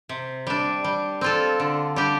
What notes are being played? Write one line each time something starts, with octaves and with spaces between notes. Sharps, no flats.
C3
G3 D4
G3
C4 F4 A4
D3
G3 D4 G4